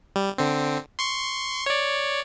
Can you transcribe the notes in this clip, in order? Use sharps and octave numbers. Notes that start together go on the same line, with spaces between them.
G3
D3 C4
C6 C#6
C#5 D5